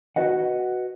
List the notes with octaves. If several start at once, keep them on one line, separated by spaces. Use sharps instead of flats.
F#4 B4 D#5 F#5